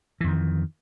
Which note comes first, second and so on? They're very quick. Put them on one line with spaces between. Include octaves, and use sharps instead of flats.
E3 F2 D#3